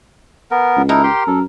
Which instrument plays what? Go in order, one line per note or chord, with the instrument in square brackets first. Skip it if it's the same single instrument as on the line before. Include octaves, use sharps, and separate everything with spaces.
[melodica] B3 A#4
[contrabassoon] C#2
[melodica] D#4 E4 A4 [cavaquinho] A#4
[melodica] G4 G5 C6
[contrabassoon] F#2 [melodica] A4